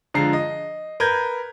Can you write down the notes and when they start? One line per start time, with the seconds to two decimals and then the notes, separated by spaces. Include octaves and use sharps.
0.14 D3 F3 G#3 A#5 C7
0.33 D#5
1.00 A#4 B4 G6 G#6